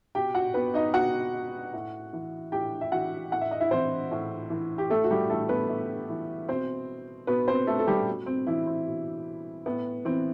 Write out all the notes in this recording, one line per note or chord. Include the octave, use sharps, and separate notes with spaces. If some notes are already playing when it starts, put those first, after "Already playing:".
B2 G4 G5
F#4 F#5
B3 B4
D#4 D#5
B2 F#4 F#5
A2
E3
A2 G4 G5
E5
E3 F#4 F#5
A2 F#5
E5
D#5
E4 E5
E3 C4 C5
A2
E3
G4
A2 A3 A4
F#4
G3 G4
E3 A3 A4
B3 B4
A2
E3
B2 C4 C5
B2 B3 B4
C4 C5
A3 A4
A4
G3 G4
B2
C4
E3 E4
C4
B2
A2 B3
E3 C4